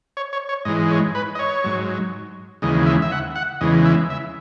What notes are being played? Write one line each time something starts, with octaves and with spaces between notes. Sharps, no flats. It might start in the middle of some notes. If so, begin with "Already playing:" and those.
C#5
C#5
C#5
G#2 E3 G#3 D#5
C#5
B4
D#5
C#5
G#2 F#3
D#2 C#3 E3 G#3 D#5
E5
E5
F#5
F#5
E2 C#3 E3 G#3 D#5
E5
E5